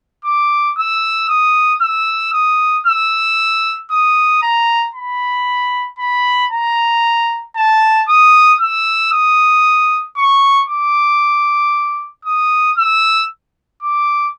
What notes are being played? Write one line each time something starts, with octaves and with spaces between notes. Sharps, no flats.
D6
E6
D#6
E6
D#6
E6
D#6
A#5
B5
B5
A#5
A5
D#6
E6
D#6
C#6
D6
D#6
E6
D6